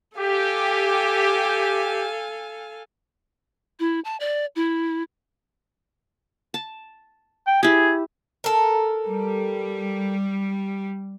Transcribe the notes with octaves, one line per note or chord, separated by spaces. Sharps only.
G4 A4 F5 G#5
E4
A5
D5
E4
A5
G5
E4 G4 G#4
A4 A#4
G3